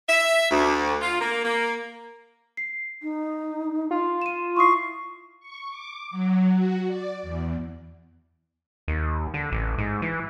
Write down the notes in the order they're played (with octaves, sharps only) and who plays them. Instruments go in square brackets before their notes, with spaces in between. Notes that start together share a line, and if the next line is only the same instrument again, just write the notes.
[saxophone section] E5
D2
F4
A#3
A#3
[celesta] C7
[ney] D#4
[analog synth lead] F4
[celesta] D#7 E7
[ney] E4 [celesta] C6 D#6 C7 [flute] C#6
[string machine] C#6
D6
F#3
F#4
D5
E2
[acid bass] D#2
D3
A1
G#2
E3